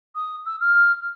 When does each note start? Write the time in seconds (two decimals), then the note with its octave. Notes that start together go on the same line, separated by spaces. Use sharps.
0.15 D#6
0.46 E6
0.60 F6